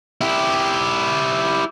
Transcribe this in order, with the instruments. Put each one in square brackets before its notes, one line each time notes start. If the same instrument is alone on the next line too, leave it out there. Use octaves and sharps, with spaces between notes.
[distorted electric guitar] E4 G4